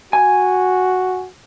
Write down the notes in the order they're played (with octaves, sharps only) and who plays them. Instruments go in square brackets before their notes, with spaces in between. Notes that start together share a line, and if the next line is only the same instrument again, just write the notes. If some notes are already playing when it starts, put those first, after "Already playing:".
[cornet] F#4 [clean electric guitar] G#5